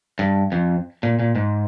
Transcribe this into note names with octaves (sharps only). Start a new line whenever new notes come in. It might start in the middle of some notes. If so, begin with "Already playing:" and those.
G2
F2
A#2
A#2
G#2